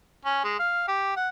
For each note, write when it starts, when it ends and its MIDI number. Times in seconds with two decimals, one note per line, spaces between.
0.25 0.42 61
0.44 0.57 56
0.59 0.86 77
0.88 1.16 67
1.16 1.29 78